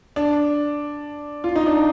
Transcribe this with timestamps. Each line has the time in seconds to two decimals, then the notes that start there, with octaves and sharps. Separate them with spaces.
0.16 D4
1.44 F4
1.56 D#4
1.66 D4